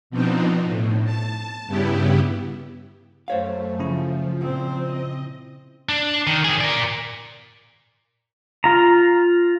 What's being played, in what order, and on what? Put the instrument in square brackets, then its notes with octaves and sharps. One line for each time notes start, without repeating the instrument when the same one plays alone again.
[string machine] B2 F3 B3 C4 D4 D#4
A2
A5
G2 C#3 B3 E4 G4
[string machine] F#2 A3 [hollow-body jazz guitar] C5 C#5 F5
[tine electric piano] C#3 C#4 E4 [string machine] F3
[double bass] A#2 C4
[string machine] D#5
[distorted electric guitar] D4
D#3
D#3 G#4
A#4 D5
[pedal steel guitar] F4 A#5